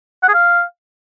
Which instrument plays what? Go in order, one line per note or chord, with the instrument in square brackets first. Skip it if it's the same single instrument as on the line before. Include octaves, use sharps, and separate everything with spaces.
[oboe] F#5
G#4
F5